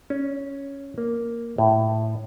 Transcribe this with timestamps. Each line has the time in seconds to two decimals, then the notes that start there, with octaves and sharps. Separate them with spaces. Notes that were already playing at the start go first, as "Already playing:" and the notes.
0.10 C#4
0.98 A#3
1.58 A2